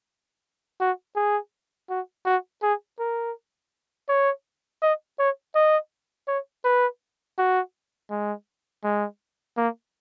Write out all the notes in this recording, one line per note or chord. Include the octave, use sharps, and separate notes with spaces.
F#4
G#4
F#4
F#4
G#4
A#4
C#5
D#5
C#5
D#5
C#5
B4
F#4
G#3
G#3
A#3